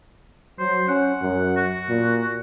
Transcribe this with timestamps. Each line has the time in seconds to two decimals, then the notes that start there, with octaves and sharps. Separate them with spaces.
0.59 F#3 C5
0.88 C#4 F#5
1.22 F#2
1.56 F#4
1.89 A#2